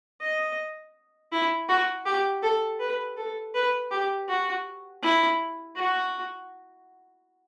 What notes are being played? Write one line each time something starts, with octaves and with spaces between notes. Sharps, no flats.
D#5
E4
F#4
G4
A4
B4
A4
B4
G4
F#4
E4
F#4